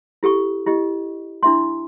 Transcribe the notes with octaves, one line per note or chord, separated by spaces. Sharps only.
E4 G4 A4 C#6
E4 G4 D#5
D4 E4 E5 C6